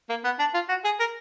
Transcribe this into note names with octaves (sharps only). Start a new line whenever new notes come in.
A#3
B3
D4
F4
F#4
G#4
A#4